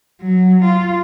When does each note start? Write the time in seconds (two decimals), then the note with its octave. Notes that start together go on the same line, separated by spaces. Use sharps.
0.21 F#3
0.64 F4